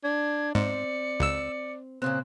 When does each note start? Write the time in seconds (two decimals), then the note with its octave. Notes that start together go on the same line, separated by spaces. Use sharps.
0.04 D4 G#6
0.55 G#2 C4 D5 C#7
1.20 C#2 E6
2.02 A#2 C#3 C4 F#6